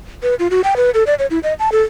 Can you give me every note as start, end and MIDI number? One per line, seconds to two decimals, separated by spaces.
0.23 0.35 71
0.39 0.48 65
0.51 0.61 66
0.64 0.74 79
0.77 0.90 71
0.94 1.03 69
1.07 1.14 74
1.19 1.26 73
1.30 1.39 64
1.43 1.53 75
1.59 1.72 81
1.72 1.82 69